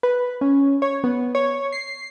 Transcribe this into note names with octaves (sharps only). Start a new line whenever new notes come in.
B4
C#4
C#5
B3
C#5
C7